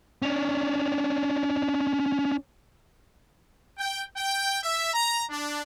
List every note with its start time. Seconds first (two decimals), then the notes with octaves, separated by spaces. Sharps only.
0.22 C#4 D4
3.78 G5
4.17 G5
4.63 E5
4.92 A#5
5.30 D4